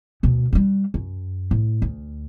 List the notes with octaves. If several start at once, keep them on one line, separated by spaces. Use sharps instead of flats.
D2 B2
G3 D4
F#2
A2
D2